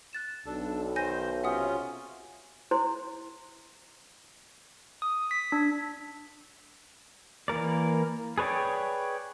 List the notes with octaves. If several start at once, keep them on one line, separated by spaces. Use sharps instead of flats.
F#6 A6 E7
B1 D4 A4
D#3 C5 G#5 G6 A#6
C3 C#4 F4 E5 F#5 D#6
E4 C5 C6
D#6
B6
D4
E3 A#3 A#4 D5
G#4 B4 C#5 D5 G5